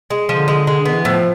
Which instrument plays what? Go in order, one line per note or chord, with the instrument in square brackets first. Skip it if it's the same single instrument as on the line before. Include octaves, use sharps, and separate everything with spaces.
[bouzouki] G#3
[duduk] D3 [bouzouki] F3
[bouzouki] G#3
G#3
[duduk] D3 [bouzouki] B3
[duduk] E3
[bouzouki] A2 [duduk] F3